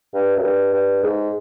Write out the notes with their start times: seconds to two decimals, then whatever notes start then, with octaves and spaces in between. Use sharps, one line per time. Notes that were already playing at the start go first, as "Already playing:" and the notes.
0.14 G2
0.36 F#2
0.43 G2
0.73 G2
1.03 G#2